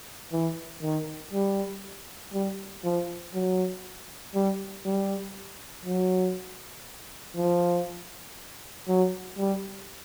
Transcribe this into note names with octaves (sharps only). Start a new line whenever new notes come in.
E3
D#3
G3
G3
F3
F#3
G3
G3
F#3
F3
F#3
G3